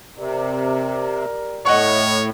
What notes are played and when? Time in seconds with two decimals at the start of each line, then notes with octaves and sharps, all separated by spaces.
0.18 C3 G4 A#4 D5
1.65 A2 C#5 D#5 F#5 C#6